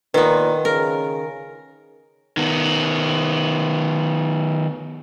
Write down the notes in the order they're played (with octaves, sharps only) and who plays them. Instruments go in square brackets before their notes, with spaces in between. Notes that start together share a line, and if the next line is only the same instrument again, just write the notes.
[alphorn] A#2 [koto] D#3 B3 [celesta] B4
[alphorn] C#3 [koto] A#4
[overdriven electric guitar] D#3 B3